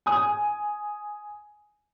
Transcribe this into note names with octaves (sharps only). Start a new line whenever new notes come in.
G#5 D#6